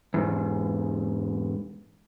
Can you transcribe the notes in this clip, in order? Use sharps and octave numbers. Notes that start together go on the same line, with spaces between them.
E2 G#2